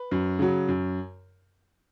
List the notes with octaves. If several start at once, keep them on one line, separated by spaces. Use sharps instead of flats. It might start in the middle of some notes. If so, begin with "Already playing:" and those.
Already playing: B4
F#2
C#3 F#3
F#2